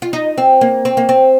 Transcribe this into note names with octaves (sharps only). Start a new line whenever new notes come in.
F4
D#4
C4
A#3
C4
A#3
C4